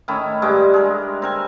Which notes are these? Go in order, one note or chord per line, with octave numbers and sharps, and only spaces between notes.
A2 D#3 C#4 E4
G2 G#3 G4 D6
G#3 A#4
C4 A#4 G#5